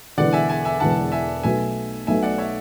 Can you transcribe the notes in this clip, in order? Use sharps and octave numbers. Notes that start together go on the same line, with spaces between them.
E1 E2 D3 D5 F#5
E5 G#5
E5 G#5
E5 G#5
E1 E2 D3 F#5 A5
E5 G#5
B1 B2 A3 E5 G#5
B1 B2 A3 E5 G#5
D5 F#5
C#5 E5